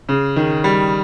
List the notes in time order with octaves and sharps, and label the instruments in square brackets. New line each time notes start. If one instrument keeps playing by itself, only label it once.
[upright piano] C#3
D#3
G3